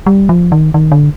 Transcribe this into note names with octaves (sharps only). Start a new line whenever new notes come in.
G3
F3
D#3
D#3
D3